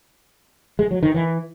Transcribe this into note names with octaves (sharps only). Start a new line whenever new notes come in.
G#3
F#3
D#3
E3